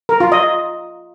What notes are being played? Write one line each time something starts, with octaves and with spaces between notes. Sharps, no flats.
A#4
F4
D#5